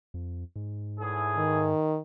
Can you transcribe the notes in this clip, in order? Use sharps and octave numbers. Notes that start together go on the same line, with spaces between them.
F2
G#2
E2 A2 G#4
D#3